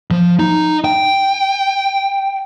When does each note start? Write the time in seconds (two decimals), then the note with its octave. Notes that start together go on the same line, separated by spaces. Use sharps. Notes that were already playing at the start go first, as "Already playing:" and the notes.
0.11 F3
0.40 D#4
0.85 G5